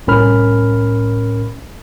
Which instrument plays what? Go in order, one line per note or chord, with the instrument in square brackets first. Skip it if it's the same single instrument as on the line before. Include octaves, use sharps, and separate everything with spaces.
[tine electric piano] C2 A2 C#4 A#4 B5 F6